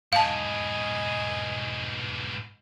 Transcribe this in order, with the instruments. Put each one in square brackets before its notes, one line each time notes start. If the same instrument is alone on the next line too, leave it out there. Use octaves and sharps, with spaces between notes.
[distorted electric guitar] G#2 B2 [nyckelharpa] D#5 G#5 [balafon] F5 A5